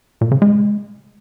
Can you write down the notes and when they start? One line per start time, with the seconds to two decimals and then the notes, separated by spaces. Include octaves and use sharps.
0.21 A#2
0.31 C#3
0.42 G#3